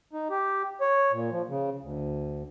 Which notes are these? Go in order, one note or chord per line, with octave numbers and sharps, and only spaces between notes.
D#4
G4
C#5
A#2
F3
C#3
D2